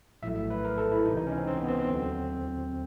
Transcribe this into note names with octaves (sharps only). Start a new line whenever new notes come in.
A#1 A2 F#3 A3 E5
E5
B4
A#4
A4
E4
C#2 C3 E3 D#4
D#4
C#4
C4
C4
B3
C4
C4
D#2 D3 F#3